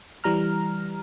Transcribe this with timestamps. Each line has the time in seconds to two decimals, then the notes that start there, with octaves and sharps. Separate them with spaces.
0.24 E3 G3 A#5 F6